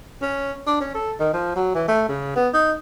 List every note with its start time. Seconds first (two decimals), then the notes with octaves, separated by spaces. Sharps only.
0.22 C#4
0.67 D4
0.81 C#4
0.95 A4
1.20 D#3
1.33 F3
1.56 F#3
1.75 E3
1.88 A3
2.09 C#3
2.36 B3
2.54 D#4